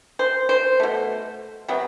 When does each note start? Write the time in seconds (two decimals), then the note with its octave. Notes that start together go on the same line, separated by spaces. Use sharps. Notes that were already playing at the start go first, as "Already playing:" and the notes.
0.19 C5
0.49 C5
0.80 B2 A3
1.68 C3 F#3 B3